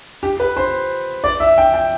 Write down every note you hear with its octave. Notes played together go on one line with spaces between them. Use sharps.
G4
B4
C5
D5
E5
G5
G5